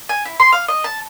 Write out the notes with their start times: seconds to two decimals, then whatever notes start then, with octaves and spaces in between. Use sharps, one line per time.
0.09 G#5
0.25 E4
0.40 C6
0.52 F5
0.68 D#5
0.84 A5